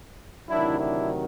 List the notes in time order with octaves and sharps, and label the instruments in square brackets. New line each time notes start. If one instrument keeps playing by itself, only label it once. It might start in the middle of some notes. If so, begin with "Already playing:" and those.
[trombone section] D2 C3 D#3 F#3 D4 E4
D4 E4